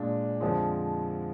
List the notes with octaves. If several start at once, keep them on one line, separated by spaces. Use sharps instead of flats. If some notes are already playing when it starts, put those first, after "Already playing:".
Already playing: A#2 G#3 D4
F2 D3 F3 G#3